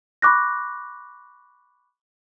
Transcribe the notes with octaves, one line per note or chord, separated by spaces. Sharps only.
B5 C#6 D6 F#6 A#6